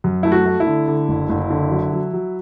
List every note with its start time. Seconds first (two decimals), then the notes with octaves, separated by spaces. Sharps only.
0.04 F#2
0.23 A3 E4
0.32 F#4
0.46 A3
0.60 E4
0.66 D3
0.88 D3
1.09 F#1
1.29 F#1
1.50 D3
1.71 F#3
1.92 F#3
2.13 F#3